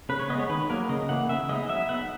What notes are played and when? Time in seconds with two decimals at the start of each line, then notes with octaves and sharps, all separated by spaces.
0.09 C#3 B4
0.19 C#5
0.30 G#3 B3 D#5
0.39 C#5
0.49 D#3 B4
0.69 F#3 A#3 A#4
0.89 C#3 D#5
1.09 E3 A#3 F#5
1.29 C#3 E5
1.49 G#3 B3 D#4 D#5
1.69 F#3 E5
1.89 B3 D#4 F#5